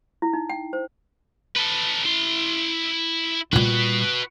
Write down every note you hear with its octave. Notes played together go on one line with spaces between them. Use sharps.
E4
D#4
G5
C5
A4 B4
E4 C6
A#2 G3 F#4 B4